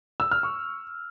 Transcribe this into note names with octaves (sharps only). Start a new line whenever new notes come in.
E6
F6
C#6